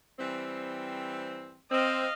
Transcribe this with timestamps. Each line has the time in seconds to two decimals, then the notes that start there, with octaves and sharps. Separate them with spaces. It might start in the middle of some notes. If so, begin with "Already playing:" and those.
0.20 E3 G3 C4
1.71 C4 D#5 F5